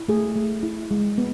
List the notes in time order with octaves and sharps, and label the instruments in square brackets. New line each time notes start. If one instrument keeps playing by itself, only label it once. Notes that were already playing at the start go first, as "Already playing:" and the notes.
Already playing: [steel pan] E4
A3 G#4
A3
E4
G#3
B3